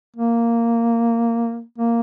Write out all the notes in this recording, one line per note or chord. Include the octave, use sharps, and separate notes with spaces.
A#3
A#3